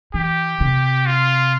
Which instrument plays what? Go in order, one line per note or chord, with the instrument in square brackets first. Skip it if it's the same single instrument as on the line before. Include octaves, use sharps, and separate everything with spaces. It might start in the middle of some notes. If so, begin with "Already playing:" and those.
[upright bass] E3 [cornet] G4
[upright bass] C3
[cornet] F4